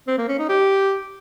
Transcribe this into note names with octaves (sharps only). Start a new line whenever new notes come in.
C4
A#3
C#4
D#4
G4